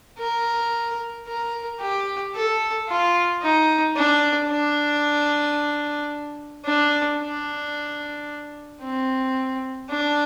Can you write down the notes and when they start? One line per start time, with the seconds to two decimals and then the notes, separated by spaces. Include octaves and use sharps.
0.19 A#4
1.27 A#4
1.81 G4
2.35 A4
2.89 F4
3.42 D#4
3.96 D4
4.50 D4
6.66 D4
7.20 D4
8.82 C4
9.90 D4